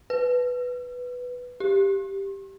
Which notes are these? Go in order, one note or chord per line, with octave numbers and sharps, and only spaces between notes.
B4
G4